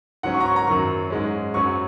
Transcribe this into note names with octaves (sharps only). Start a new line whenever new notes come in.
G#2 F#3 C#4 F#5
C#6
A#5
C#6
A#5
F#2 D#3 F#3 C#6
G#2 G#3 C#4
F#2 F#3 C#4 C#6